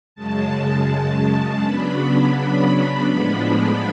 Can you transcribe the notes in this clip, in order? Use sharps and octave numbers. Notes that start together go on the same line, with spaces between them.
F#2 C#3 G#3 A5
C#3 F#3 B3 D4 B5
B5
A2 F3 G#3 B3 D4